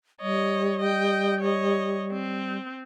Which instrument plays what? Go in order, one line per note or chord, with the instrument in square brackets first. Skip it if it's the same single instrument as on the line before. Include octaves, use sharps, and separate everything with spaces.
[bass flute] G3 [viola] C#5 D#5
[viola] D#5 G5
C#5 D#5
C4